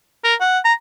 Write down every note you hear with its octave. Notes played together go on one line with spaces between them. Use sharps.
A#4
F#5
A#5